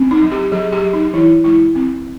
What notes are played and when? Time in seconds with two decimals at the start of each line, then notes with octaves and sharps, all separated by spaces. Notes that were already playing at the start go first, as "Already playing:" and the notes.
Already playing: C4
0.11 D#4
0.22 F#3
0.32 G4
0.52 F#3 G#4
0.73 G4
0.83 F#3
0.93 D#4
1.14 E3 E4
1.44 G#3 E4
1.75 C4